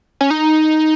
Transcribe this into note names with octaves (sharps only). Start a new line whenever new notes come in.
C#4
D#4